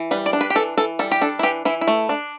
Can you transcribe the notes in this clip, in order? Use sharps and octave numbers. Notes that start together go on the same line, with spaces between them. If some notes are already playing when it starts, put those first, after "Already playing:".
Already playing: E3
G3 B4
D5
D4
B4
G4
E3 A4
E3 A4
G3 A4
G4
D4 A4
E4
E3 G4
E3 E4
E4
A3
D4